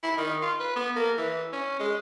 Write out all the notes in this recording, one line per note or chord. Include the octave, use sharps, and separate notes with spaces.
E4
D#3
F4
B4
B3
A#3
E3
C#4
G#3